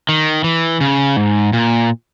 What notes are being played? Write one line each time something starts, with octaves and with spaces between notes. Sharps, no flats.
D#3
E3
C#3
G#2
A#2